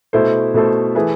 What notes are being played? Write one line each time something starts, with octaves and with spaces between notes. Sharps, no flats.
B2 A3 E4 A4 C5
B2 A3 E4 A4 C5
E3 A3 E4 G#4 B4